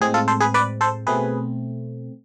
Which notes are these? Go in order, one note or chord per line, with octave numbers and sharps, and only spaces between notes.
A2 G#3 C4 G#4
F4 A4
A4 C5
G#4 B4
B4 D5
A4 C5
B2 A3 C4 G#4 B4